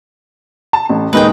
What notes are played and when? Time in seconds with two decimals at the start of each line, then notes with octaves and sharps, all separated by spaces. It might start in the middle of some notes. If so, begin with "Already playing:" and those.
0.73 A5
0.90 A1
1.13 D#1 D#3 G#3 B4 D#5 G5